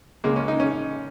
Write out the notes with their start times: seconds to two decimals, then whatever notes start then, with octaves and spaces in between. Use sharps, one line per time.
0.24 C#2 C#3 G#3 A#3
0.36 C#4
0.48 D#4
0.60 C#4